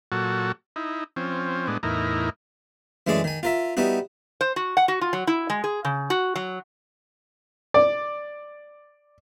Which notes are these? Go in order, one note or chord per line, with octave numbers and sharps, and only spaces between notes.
A#2 F#3 F#4 A4
D#4 E4
F3 C4 C#4
A2 G#3 B3 D4
E2 A2 D#4 E4 A#4
F#2 E3 G#3 A3 G#4 D5
D#3 G#5
F4 A#4 E5
G3 B3 D#4 E4 F#4
C5
F#4
F#5
F#4
F4
F#3
E4
G#3
G#4
C#3
F#4
F#3
D5